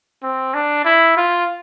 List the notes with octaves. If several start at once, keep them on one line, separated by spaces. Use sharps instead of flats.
C4
D4
E4
F4